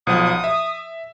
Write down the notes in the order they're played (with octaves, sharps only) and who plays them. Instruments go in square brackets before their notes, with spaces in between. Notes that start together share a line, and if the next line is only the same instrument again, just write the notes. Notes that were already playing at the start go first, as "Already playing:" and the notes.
[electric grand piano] B1 F3 F#5 [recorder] D#6
[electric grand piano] E5